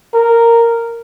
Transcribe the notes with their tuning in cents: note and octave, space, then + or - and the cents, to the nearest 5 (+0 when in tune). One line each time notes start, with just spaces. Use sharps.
A#4 -10